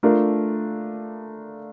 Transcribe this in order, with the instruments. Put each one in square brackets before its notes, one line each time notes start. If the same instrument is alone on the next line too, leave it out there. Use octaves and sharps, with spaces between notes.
[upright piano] A3 D4 F4 A#4